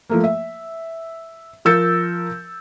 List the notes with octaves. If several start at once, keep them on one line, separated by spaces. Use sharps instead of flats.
F3 A3 A#3
E5
F3 A#4 E6 G6 A6 C#7